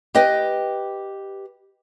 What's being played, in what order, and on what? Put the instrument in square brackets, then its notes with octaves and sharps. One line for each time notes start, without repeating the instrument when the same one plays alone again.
[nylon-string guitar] G4 B4 D#5 G5